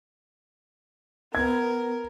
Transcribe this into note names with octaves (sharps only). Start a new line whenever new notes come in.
B3 A#4 G#6